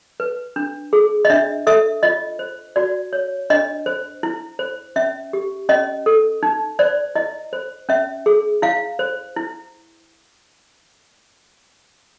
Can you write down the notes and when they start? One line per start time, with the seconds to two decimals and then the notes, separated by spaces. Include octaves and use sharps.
0.20 B4
0.56 D4
0.93 G#4
1.25 D#5
1.30 D4 E5
1.67 A4 E5
2.03 F4 D#5
2.39 C5
2.76 F#4 D5
3.13 C#5
3.50 D4 D#5
3.86 C5
4.23 E4
4.59 C5
4.96 C#4 E5
5.33 G4
5.69 C#4 D#5
6.06 A4
6.43 D#4
6.79 C5 D5
7.15 E4 D#5
7.53 C5
7.89 C#4 E5
8.26 G#4
8.62 E4 F5
8.99 C5
9.36 E4